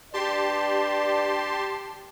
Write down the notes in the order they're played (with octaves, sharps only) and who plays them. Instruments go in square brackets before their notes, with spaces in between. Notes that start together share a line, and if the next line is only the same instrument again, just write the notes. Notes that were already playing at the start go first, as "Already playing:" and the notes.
[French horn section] D4 B4 D5 [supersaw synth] G4 A5 C6